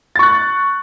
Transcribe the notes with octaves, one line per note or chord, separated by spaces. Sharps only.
C#6 F#6 A6